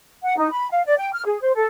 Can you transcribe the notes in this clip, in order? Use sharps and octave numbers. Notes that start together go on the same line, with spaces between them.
F#5
D#4
B5
F5
D5
G5
F6
G#4
C5
A4